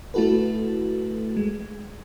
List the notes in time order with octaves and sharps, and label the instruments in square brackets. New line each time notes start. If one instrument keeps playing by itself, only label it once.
[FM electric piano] A3 E4 F#4 A4 B4
G#3